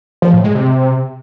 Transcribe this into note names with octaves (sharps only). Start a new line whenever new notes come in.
F3
A2
G#3
C3